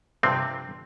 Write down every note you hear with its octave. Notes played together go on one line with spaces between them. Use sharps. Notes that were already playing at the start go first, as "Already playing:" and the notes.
G2 C3 F3 C4